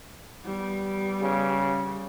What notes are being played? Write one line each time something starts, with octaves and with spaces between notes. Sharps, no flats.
G3 B3
C#3